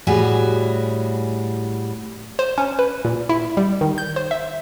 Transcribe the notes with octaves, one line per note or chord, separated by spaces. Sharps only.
A2 G3 F#4 G#4
C5
C#4
B4
A#2
E4
G3
D#3
G6
C5
E5